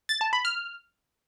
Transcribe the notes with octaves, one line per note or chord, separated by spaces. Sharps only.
A6
A5
B5
F6